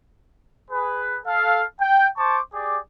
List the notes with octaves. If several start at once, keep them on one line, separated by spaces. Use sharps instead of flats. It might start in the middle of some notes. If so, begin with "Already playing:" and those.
G#4 B4
A4 F5
G5
C5 A5 C#6 D6
G4 G#4 D5